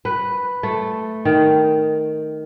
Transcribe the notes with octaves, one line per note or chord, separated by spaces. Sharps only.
B4
A3
D#3